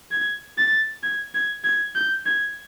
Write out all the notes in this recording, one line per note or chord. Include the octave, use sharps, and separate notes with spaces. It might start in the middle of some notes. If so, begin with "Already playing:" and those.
G#6
A6
G#6
G#6
G#6
G6
G#6